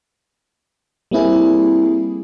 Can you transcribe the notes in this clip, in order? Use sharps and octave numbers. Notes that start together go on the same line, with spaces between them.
G3 A#3 C4 E4 G#4